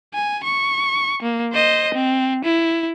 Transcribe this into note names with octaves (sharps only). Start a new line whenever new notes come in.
G#5
C#6
A#3
C5 D#5
C4
E4